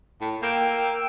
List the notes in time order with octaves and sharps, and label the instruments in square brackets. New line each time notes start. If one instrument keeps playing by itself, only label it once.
[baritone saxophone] A2
[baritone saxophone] A#3 [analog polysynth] G5 E6 D7